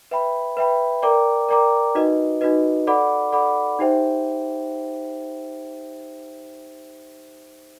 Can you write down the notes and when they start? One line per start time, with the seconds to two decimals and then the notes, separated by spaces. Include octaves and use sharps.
0.11 B4 E5 G5 B5
0.57 B4 E5 G5 B5
1.03 A#4 D5 G5 A#5 D6
1.49 A#4 D5 G5 A#5 D6
1.95 D#4 F#4 B4 D#5
2.41 D#4 F#4 B4 D#5
2.87 A4 D5 F#5 B5 D6
3.32 A4 D5 F#5 B5 D6
3.79 D#4 G4 C5 E5 G5